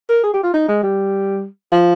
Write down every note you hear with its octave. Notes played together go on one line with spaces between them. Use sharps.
A#4
G#4
G4
F4
D#4
G#3
G3
F3